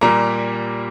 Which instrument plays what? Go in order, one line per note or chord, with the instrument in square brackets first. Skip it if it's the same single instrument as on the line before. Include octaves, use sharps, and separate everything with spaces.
[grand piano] A#2 G3 A#3 A#5